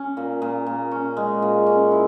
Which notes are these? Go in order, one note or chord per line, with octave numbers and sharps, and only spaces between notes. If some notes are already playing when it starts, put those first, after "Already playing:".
Already playing: C#4
A#2
A#2
A#2
C#4
G#3
A#2
C#4
E4